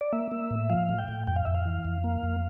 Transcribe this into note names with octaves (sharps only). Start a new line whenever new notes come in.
D5
A#3 E5
A#3
A2
F3 F5
A2
G5
A2
F2 G5
F5
F2 E5
F5
E3
F2
A#3
F2